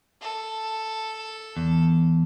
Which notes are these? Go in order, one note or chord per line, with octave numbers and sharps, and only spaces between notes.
A4
E2